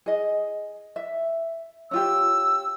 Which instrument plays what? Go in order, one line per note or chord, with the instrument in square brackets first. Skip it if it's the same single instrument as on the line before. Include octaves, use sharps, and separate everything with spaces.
[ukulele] G#4 D#5
E5
[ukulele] C#4 F4 G4 [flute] E6